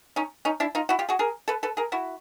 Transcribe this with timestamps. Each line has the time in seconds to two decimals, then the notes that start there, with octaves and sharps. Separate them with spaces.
0.16 C#4 D#4
0.45 C#4 D#4
0.60 D4 E4
0.75 D#4 F4
0.89 E4 F#4
0.99 F4 G4
1.09 F#4 G#4
1.19 G#4 A#4
1.48 A4 B4
1.63 A4 B4
1.77 G#4 A#4
1.92 E4 F#4